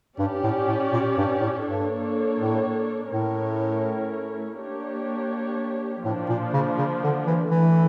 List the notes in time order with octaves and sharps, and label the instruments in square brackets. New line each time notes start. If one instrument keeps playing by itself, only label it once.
[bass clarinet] G2 [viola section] C#4 G4 D5
[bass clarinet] A2
A2
A#2
G2
A2
[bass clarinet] G2 [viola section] A#3 D4 A4 C#5
[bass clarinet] A2
[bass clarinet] A2 [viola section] A3 C#4 E4 A#4 C#5
[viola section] A#3 D4 G4 C#5
[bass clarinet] A2 [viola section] F3 A#3 D4
[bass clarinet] A#2
C#3
C#3
D3
E3
[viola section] D3 A3 E4 A4 [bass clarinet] E3